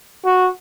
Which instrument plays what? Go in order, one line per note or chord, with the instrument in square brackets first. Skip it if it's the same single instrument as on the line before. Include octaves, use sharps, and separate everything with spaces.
[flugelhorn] F#4